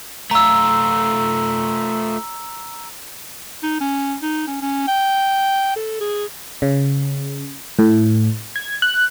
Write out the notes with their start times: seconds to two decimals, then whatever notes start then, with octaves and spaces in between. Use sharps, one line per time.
0.31 A3 F4 A#5 E6
3.63 D#4
3.81 C#4
4.22 D#4
4.47 C#4
4.62 C#4
4.87 G5
5.76 A4
6.01 G#4
6.62 C#3
7.79 A2
8.56 G#6
8.82 F#6